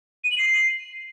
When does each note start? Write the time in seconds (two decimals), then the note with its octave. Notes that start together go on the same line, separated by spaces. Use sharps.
0.24 D#7
0.31 F#7
0.38 C7